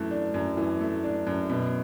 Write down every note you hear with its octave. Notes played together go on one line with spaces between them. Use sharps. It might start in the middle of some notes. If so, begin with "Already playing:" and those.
Already playing: F#2 E3 A3
D4
F#2
E3
A3
D4
F#2
B2